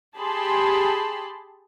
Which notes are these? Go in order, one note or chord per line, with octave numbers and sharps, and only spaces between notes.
G4 G#4 A5 B5 C6